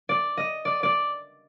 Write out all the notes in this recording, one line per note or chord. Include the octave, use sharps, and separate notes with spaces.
D5
D#5
D5
D5